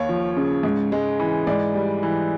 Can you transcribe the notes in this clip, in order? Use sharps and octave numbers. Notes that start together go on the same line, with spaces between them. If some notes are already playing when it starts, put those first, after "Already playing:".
Already playing: D#2 C#5
F3
C#3
G#2
G#3
E3
G#2 D5
G3
E3